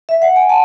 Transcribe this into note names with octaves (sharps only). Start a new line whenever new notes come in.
E5
F#5
G#5
F#5 A5